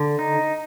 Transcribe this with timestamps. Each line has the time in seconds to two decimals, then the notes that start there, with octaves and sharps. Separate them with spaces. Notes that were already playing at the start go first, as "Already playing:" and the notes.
Already playing: D3
0.19 D#4